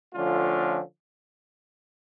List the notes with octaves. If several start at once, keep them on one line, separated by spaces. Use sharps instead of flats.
D3 F3 A3 C#4 F4